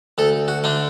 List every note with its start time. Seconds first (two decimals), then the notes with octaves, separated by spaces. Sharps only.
0.18 D2 A4
0.48 F#4
0.64 D3 A3 D4